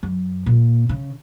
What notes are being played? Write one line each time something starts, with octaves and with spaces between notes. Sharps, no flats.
F#2
A#2
C#3